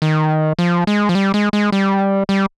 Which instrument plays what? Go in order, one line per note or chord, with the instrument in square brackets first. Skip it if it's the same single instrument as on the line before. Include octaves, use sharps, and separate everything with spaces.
[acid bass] D#3
F3
G#3
F3
G3
G#3
G#3
G3
G3